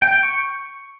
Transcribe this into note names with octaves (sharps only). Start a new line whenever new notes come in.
G5
G5
C#6